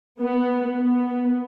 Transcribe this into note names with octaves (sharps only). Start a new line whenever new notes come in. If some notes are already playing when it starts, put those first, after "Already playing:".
B3
B3